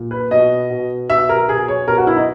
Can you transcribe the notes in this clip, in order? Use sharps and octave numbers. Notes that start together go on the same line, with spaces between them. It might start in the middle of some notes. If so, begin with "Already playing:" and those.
Already playing: A#2
B4
B2 D#5
B2
B2 E5
A#4
B2 G#4
C#5
B2 A#4
F#4
E4
D#4